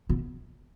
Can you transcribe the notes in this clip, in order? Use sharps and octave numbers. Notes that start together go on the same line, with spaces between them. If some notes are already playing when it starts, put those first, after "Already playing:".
B2